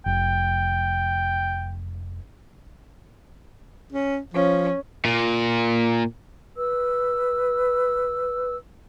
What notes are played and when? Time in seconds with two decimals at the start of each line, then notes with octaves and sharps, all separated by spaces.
0.06 F1 G5
3.92 C#4
4.34 F3 C#4
5.05 A#2
6.56 B4 E6